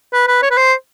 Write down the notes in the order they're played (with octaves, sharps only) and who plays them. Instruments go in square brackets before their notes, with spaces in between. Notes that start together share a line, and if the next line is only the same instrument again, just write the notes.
[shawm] B4
B4
C#5
B4
C5